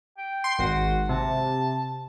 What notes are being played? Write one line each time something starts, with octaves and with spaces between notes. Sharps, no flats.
G5
C6
G#1 F#4
C3 A5